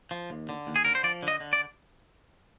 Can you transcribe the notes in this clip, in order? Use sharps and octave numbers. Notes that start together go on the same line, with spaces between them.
F3
D#2
D3
D#2
G#4
D3 A#4
C5
F3 D5
D3
D#5
D3
D5